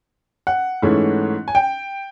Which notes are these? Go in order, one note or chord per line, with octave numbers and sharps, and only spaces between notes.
F#5
G#2 E3 A3 C#4 E4
G#5
G5